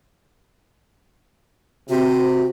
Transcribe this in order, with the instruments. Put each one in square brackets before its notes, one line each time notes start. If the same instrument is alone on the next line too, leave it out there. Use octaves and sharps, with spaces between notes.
[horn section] C3 [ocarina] F#4